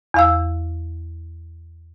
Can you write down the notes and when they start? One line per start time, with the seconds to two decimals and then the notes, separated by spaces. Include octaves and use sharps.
0.14 E2 F5 E6